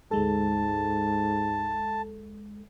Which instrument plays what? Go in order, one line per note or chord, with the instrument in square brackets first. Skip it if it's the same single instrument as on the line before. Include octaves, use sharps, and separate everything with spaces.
[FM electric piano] D2 G#3 A4 [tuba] G#2 [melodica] A5